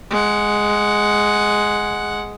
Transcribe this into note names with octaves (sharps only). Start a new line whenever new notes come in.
G#3 F#5